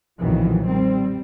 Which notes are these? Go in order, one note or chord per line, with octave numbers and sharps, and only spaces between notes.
B1 F2 A#2 D#3 E3 F#3
G3 C4